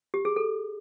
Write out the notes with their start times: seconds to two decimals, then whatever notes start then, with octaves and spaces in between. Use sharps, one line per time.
0.14 G4
0.25 G#4
0.36 A4